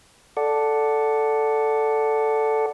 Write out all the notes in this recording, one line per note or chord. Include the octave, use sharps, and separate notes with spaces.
A4 D5 F#5